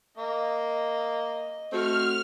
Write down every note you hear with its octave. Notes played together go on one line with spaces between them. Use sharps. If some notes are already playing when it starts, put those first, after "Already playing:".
A#3 D#5
A3 C4 F#4 F6